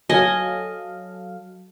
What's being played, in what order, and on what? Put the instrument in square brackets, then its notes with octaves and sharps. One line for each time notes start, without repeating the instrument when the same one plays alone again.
[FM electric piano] F#3 A4 F5 [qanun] D#5 [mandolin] G#5